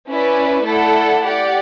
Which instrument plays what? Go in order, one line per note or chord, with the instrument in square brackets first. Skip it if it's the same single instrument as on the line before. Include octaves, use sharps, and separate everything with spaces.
[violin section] C#4 E4 B4 D5
A3 E4 A4 D5 F#5
G4 D5 F#5